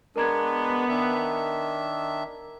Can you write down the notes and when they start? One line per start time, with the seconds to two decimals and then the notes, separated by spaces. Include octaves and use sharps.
0.16 G#3 B3 D4 A#4 A#5 G#6
0.89 D#3 D4 E5